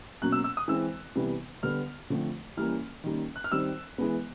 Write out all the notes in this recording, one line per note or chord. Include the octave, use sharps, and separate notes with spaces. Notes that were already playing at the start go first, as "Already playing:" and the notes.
B2 F#3 A#3 C#4 F#6
E6
E6
D#6
E3 G#3 C4 E6
C3 E3 G3 B3
D3 G3 B3 F6
D3 F3 A3 C4
E3 G3 A#3 C#4 F6
D#3 G3 A#3 C#4
F#6
F6
D#3 G3 C4 E6
E3 G#3 B3